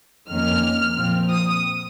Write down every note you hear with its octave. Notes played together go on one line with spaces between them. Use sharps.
F2 D#3 A#3 C#4 F6
A#2 F3 C4
D#6